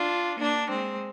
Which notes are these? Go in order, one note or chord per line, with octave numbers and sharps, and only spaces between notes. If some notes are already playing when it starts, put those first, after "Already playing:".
Already playing: D4 F4
A#3 D4
G#3 C4